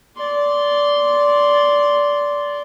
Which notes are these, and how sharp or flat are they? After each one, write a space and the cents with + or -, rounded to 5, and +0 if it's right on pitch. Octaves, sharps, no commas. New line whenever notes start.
D5 -15 C6 +0